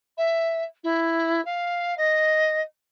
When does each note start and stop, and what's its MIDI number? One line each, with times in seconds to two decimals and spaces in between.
0.17 0.64 76
0.84 1.43 64
1.45 1.94 77
1.98 2.61 75